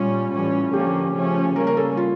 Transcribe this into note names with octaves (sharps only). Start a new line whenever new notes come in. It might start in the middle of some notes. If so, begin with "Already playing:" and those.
Already playing: A#2 G3 C#4 F4
A2 E3 G3 C#4
D3 F3 A#3 C#4 G4
C#3 F3 A3 C#4
C#3 G3 A#3 C#4 A#4
A#4
A4
F4